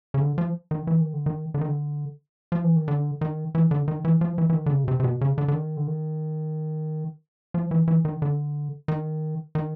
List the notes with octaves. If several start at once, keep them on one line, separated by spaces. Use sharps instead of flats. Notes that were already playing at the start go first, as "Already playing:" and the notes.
C#3
D3
F3
D#3
E3
D#3
D3
D#3
D3
D#3
D3
F3
E3
D#3
D3
D#3
E3
D3
D#3
E3
F3
E3
E3
D#3
D3
C#3
B2
C3
C3
B2
C#3
D3
D3
D#3
D3
D#3
F3
E3
E3
D#3
D3
D#3
D#3